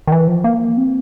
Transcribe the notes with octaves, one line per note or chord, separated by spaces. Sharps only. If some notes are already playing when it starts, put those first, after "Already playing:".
D#3
E3
F3
A#3
C4